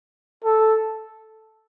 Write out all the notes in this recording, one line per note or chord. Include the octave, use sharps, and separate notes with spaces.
A4